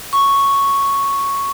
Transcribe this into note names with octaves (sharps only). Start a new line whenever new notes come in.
C#6